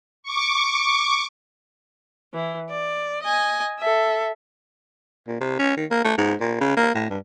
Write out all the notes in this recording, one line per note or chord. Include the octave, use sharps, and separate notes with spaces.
C#6 D6
E3
D5
D#5 G#5
A4 E5
A#2
C3
C#4
D#3
A#3
A3
G#2
A#2
C#3
A#3
A2
G2